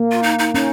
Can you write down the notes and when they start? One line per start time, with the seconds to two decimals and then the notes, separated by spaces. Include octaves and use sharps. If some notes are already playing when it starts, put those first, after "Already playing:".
Already playing: A#3
0.11 F4
0.23 D#4
0.39 D#4
0.54 C#4 D#4